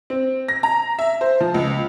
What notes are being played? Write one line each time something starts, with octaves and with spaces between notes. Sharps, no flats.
C4
A#6
A#5
E5
C5
F3
C#2